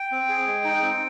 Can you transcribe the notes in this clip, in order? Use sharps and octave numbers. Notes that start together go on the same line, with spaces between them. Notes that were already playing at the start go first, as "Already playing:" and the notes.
Already playing: G5
C4
G#4
G#3
D#4
C4